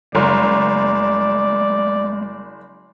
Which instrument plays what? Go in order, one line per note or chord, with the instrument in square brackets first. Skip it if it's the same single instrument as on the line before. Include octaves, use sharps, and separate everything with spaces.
[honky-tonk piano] F#1 [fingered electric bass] G3 G#3 [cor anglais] D5